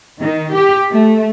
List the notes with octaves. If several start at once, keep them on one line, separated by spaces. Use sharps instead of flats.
D#3
G4
A3